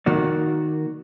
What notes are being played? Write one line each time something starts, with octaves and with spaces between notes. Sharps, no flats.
D#3 A#3 F#4 D5